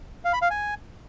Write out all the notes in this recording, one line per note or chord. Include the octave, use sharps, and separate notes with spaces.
F5
B5
F5
G#5